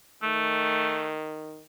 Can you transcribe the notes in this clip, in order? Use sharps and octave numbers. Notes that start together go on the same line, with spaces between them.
D#3 A3